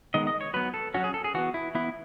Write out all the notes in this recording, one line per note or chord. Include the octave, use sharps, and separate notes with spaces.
D#3 G#3 B3 D#5
D#5
C#5
F#3 B3 B4
A4
F#3 C#4 F#4
G#4
A4
G#4
E3 B3 F#4
E4
E3 B3 E4